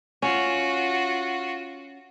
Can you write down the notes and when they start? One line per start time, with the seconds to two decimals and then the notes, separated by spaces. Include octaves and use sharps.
0.22 C#4 F4 F#4